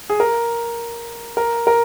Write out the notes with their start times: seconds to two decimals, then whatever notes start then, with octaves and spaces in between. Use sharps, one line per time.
0.10 G#4
0.20 A#4
1.37 A#4
1.67 A#4